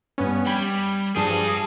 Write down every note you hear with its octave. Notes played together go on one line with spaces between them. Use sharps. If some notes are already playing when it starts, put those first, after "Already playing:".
G2 B3 C#4
G3 G5 B5 G#6
G2 F3 G4 G#4 A5